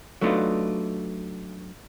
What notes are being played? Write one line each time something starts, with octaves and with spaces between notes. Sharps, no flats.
F#3 A3 B3 D4 D#4 F4